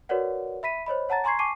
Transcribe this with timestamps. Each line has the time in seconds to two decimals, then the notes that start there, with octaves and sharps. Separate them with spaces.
0.09 F#4 A#4 B4 C#5 D5 F#5
0.63 E5 B5 B6 D#7
0.86 C5 C#5 D#5 B5
1.09 C#5 F#5 A5 A#5 A6
1.24 G#5 A#5 C6 C#6 G#6 C7
1.39 G#5 A5 C#6 D6 C7 D#7